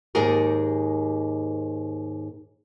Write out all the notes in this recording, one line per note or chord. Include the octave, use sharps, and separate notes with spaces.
D#2 G#2 D#4 G4 G#4 A#4